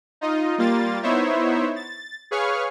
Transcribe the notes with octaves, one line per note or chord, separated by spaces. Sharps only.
D#4 F4 D#5
G3 A#3 F4 A6
B3 D#4 E4 C5 C#5 E5
A6
G#4 B4 C#5 F5 C#6 F6